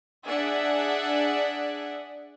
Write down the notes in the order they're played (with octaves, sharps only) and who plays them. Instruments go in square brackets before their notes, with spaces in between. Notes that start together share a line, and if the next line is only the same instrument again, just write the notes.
[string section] D4 G#4 D5 E5 F#5